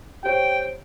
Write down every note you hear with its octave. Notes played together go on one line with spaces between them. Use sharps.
G4 C5 C#5 G5